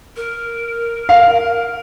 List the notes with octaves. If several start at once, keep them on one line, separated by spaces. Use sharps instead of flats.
A#4
F5